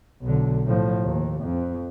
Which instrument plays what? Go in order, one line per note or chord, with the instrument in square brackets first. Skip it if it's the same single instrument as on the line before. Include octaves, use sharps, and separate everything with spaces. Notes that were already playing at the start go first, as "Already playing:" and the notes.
[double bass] B1 D3
A2 F3
D#2
F2